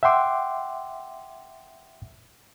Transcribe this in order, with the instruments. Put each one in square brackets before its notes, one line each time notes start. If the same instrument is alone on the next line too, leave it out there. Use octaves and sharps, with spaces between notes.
[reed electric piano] E5 F#5 G5 C6 D6